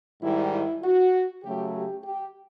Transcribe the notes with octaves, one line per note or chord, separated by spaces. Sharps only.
G#2 D#3 G3 E4
E4
F#4
C#3 F#3 A3 G4
G4
G4